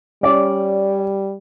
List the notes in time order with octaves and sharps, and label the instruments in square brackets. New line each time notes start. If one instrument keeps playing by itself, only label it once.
[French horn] G3 [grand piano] C#4 [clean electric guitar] D5